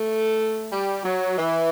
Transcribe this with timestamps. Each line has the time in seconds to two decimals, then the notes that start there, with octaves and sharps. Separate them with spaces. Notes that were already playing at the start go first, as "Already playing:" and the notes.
Already playing: A3
0.71 G3
1.04 F#3
1.38 E3